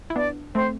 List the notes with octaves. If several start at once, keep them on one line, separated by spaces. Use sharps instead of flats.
E4
B3 D4 D5
A3 C4 C5